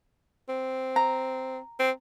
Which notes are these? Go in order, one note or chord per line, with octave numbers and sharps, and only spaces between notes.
C4
A#5
C4